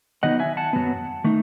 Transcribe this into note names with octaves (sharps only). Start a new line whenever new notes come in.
D#3 F#3 B3 D#4 D#5 F#5
E5 G#5
F#5 A5
F#2 D#3 F#3 B3
D#3 A3 D#4